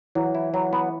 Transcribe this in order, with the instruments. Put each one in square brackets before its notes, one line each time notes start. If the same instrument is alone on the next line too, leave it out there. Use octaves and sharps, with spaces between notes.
[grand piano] E3 [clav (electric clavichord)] F#3
[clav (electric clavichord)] E4
F#3
B3